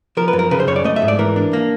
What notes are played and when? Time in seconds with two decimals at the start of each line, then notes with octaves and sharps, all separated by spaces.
0.17 F3 A#4
0.28 B4
0.33 F#2
0.39 A#4
0.51 C#3 B4
0.60 C5
0.67 F#2 C#5
0.76 D5
0.84 A3 D#5
0.96 E5
1.02 G#2
1.08 D5
1.19 E3 A#4
1.36 D4
1.53 A#3